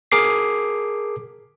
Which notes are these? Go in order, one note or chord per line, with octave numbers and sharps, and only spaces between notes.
G#4 A#4 D6 C7